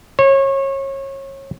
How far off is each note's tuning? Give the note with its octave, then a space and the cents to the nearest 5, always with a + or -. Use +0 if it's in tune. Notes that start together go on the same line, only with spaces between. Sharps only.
C#5 -30